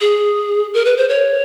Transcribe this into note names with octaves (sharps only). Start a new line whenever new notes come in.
G#4
A#4
B4
C5
C#5